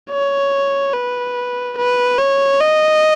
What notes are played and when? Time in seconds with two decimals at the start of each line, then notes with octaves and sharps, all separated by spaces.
0.11 C#5
0.94 B4
1.77 B4
2.18 C#5
2.61 D#5